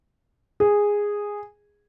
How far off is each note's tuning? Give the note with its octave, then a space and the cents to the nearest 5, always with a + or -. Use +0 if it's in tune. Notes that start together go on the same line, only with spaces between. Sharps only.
G#4 -10